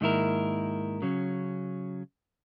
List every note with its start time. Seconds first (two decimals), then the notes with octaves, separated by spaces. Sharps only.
0.01 G#2 D#3 A#3 E4 A#4
1.02 C#3 F#3 C#4